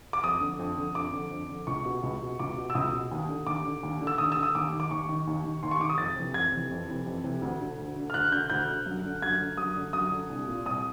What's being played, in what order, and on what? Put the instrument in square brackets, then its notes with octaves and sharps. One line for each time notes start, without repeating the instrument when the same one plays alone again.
[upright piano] D6
F2 D#6
D3
F2
D3
F2 D6
D3
F2
D3
C#2 C#6
B2
C#2
B2
C#2 D6
B2
E6
C#2 D#6
B2
D#2
D3
D#2 D6
D3
D#2
D3
E6
D#2 D#6
D3 E6
D#6
D#2 D6
D#3
D6
D#2 C#6
D#3
D#2
D#3
D#2 C6
C#6
D#3 D6
D#6
F2 A6
C3 E3
F2 G#6
C3 E3
F2
C3 E3
F2
C3 E3
D2
D3
D2
D3
F6
D2 F#6
D3 G6
D2 G6
D3
F#2
D3
F#2 G#6
D3
F#2 D#6
D3
F#2 D#6
D3
C2
A#2
C2 D#6